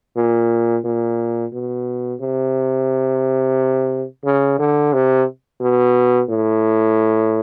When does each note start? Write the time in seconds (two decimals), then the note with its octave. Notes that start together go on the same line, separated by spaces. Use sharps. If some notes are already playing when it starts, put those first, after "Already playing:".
0.16 A#2
0.84 A#2
1.53 B2
2.20 C3
4.25 C#3
4.59 D3
4.93 C3
5.61 B2
6.29 A2